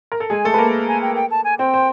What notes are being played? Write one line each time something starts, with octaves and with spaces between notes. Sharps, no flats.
A#4
A4
G#3 G#4 G#5
A3 A4
B4 A5
A#3 A#4
G#5
G5
G5
A5
G#5
C4 C5 G5
C5